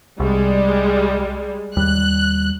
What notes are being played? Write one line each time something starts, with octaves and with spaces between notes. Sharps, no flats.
C2 G3 G#3
D#2 G3 F#6